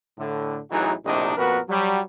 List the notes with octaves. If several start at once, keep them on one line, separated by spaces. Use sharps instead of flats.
A2 D3
A1 E3 F#3 D#4 F#4 G#4
A#1 A2 C3 D4 D#4
F2 A#2 B3 F#4 A#4 B4
F#3 G3